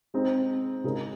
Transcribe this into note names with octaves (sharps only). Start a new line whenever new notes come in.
G#3 C4 D#4
C#3 G#3 D#4 A#4